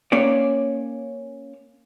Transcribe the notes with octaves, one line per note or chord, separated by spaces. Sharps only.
A#3 C#4 C#5 D5